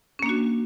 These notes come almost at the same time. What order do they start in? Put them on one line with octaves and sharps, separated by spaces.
C#4 A#3 D4 F#4